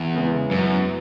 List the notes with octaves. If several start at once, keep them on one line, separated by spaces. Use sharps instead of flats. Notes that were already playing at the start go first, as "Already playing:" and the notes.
Already playing: E2
C#3 G#3 B3 E4
F#2 F#3 B3 E4